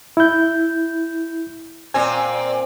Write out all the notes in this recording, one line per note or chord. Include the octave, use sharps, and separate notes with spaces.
E4 G6
A#2 C4 G#5